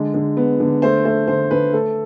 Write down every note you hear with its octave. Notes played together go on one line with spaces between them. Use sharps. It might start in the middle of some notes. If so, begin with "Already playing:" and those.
Already playing: D3 G#3
D3
B3
D3
A3 C5
A3 C5
D3 C5
D3 B4
A3 A4